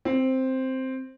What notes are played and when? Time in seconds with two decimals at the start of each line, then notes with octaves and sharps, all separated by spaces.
0.05 C4